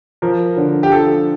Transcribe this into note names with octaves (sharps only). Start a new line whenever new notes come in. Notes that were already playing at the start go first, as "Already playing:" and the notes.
F3 A#4
D3
G4
F3 A4